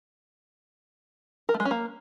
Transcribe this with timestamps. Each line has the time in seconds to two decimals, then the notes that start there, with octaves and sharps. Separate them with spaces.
1.49 A#4
1.54 A3
1.60 G#3
1.65 C#4
1.71 A#3